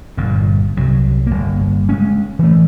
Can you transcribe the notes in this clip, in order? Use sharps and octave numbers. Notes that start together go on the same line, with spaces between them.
G1 G2 A#2
C2 F#3
G1 A#3
G#3 B3 C#4
E3 A3